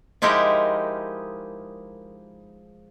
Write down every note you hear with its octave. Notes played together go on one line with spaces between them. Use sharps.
F3 G#3 D#4 E4 G4 A#4